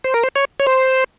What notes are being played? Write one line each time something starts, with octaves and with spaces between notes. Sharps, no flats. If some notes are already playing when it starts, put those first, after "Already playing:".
C5
A#4
C5
C#5
C#5
C5